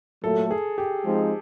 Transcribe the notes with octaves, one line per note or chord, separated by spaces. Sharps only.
A#2 F#3 A3 A4
G#4
G4
F3 G#3 C4 D#4